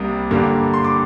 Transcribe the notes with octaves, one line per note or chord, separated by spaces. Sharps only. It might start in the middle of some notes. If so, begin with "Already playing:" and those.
Already playing: C2 C3 G3 A#3 D#6
G2 D3 G3 A#3
C6
D6